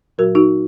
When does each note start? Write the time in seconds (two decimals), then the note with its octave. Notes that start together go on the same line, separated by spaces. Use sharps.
0.18 A#2 F#3 F#4 A#4
0.35 D#4 F#4